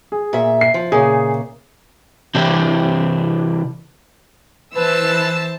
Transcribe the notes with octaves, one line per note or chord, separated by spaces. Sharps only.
G#4
A#2 E5
C7
F3
A#2 C#3 G#4
C3 E3 C4 D4 E4 G4
E3 B4 C5 A5 E6